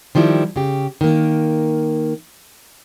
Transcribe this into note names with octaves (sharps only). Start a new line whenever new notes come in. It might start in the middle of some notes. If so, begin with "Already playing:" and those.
D#3 F3 G3 E4
C#3 G4
D#3 A#3